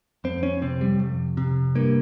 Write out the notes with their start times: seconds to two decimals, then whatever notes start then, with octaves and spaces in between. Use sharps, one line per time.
0.24 F2 C4
0.43 C#4
0.62 C3 C4
0.81 G3
0.99 F2
1.37 C3
1.75 G2 A#3